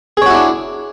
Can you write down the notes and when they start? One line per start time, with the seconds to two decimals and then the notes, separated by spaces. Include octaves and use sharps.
0.17 G#4
0.22 C#5
0.26 F#4
0.30 E4
0.35 D4